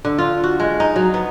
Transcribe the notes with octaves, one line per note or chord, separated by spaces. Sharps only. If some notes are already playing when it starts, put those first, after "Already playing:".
D3
F4
F#4
G#3
D#4
F#3
B3